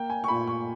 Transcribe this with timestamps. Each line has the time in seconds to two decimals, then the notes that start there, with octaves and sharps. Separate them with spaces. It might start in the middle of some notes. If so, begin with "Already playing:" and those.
Already playing: A#3 G5
0.10 G#5
0.24 C#6
0.28 A#2 B5
0.47 C#6